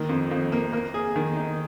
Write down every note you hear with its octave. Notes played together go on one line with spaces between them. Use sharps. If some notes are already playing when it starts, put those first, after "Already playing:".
Already playing: D#3 A#3
F2
F2
A#3
A#3
G#4
D#3
D#4